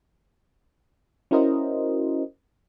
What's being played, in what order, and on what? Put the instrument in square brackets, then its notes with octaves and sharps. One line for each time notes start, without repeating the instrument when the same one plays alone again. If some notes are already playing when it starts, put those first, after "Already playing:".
[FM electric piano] C#4 E4 F#4 A#4 C5 D#5